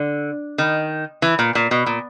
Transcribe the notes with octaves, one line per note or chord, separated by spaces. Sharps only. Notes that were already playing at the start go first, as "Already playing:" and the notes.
Already playing: D3
D#3
E3
A#2
A#2
B2
A#2